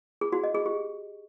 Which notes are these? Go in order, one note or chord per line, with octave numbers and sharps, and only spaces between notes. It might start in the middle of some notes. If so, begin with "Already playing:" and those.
G#4
F#4
D#5
G#4
G4